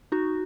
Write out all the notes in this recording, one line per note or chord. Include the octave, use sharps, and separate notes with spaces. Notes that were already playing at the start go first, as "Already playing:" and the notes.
D#4 F#4